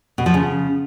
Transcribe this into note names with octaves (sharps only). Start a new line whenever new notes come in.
B2
F3
C#3